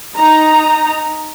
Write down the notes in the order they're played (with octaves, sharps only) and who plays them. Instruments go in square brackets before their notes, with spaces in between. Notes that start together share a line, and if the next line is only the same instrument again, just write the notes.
[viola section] D#4 A#5